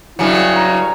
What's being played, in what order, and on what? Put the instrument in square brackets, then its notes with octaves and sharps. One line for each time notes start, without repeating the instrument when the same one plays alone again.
[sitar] G2 C#3 F#3 [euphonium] E4
[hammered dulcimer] A#5